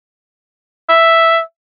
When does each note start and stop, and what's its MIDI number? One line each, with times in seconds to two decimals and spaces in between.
0.89 1.39 76